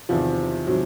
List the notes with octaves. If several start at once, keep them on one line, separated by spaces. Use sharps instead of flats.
E2 C3 D#3 F3
C3 D#3 F#3